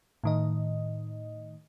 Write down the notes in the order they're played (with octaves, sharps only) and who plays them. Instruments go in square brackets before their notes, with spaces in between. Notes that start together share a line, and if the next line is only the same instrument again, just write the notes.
[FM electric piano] A2 D#3 D#5